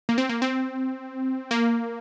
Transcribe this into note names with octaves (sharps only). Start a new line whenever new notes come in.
A#3
C4
A#3
C4
A#3